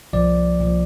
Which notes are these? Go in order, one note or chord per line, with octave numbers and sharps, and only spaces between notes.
C2 A#2 F3 D5
C2 A#2 F3